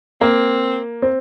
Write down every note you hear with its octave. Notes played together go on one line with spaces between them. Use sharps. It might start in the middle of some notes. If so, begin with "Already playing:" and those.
A#3 C4
C4